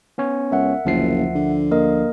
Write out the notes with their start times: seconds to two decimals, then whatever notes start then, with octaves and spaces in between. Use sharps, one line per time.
0.18 B3 C#4 C#5
0.51 C#2 A#4 E5 F#5
0.85 F#1 D2 F3 C7
1.35 D3
1.71 A#3 A#4 D#5